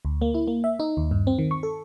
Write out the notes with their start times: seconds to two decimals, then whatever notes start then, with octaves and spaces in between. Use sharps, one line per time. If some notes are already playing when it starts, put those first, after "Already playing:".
0.05 D2
0.21 A#3
0.34 E4
0.47 A#3
0.64 E5
0.80 D#4
0.97 D#2
1.11 G2
1.27 C4
1.39 D#3
1.51 C#6
1.63 A4